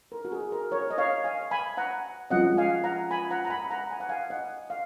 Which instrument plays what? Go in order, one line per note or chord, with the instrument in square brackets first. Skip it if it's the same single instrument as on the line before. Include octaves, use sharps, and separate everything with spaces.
[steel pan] A#4
F#4
G#4
A#4
A#4 C#5
D#5
C#5 F5
F5 G#5
G#5 B5
F#5 A#5
[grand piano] F3 G#3 C#4 F4 [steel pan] D#5 F#5
[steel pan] F5 G#5
F#5 A#5
G#5 B5
F#5 A#5
A#5
G#5 B5
F#5 A#5
G#5
F#5
F5 G#5
D#5 F#5
F5